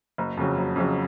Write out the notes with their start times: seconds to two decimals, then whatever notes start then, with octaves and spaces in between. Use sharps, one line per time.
0.18 F#1
0.37 F2 C#3 F#3
0.57 F#1
0.76 F2 C#3 F#3